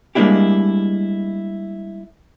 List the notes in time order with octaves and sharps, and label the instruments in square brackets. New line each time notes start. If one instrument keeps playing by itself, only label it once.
[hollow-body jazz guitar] G3 G#3 A#3 D4 E4 G4